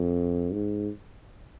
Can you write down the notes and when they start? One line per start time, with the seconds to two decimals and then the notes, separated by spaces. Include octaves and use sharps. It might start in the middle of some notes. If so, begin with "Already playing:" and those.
Already playing: F2
0.53 G#2